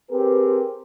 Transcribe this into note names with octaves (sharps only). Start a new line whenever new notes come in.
C4 G4 G#4 A#4 B4